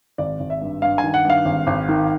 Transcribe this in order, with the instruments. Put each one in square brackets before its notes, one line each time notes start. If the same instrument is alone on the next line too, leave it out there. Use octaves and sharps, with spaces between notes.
[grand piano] G#1 D5
G#1
E5
G2
G2 F5
G#5
D#3
F#5
G2 F5
G#1
G#1
D#3